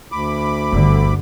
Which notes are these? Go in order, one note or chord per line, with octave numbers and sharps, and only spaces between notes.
D2 B5 D6
G1 G2 D3